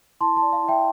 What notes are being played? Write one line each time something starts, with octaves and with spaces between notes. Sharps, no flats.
E4 A5 C6
A5 C6
D5
F5
E4
E5 G5